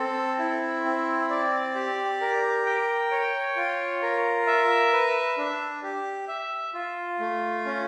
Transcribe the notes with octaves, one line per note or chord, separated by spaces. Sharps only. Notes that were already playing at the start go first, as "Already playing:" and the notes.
Already playing: C4 A4
E4
C4
D5
G4
A#4
G5
C#5
F4
A#4
E5
B4
D4
G4
E5
F4
A3
C#4